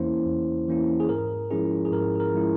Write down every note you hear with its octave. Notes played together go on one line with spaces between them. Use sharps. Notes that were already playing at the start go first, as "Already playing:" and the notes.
Already playing: E2 E3 A#3 C#4 E4 C5
E2
E3 A#3 C#4 E4
G#4
G#2 A#4
F3 G#3 C#4 E4 G#4
G#4
G#2 A#4
G#4
A#4
F3 G#3 C#4 E4